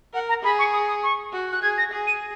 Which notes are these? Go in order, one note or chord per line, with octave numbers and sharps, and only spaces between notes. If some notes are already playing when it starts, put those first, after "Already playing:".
A#4 F#5
A#5
G#4 B5
C#6
D#6
D#6
C#6
F#4
F#6
G#4 G#6
A#6
G#4
D#7